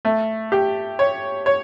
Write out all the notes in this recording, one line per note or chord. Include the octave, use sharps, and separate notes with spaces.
A3
G4
C#5
C#5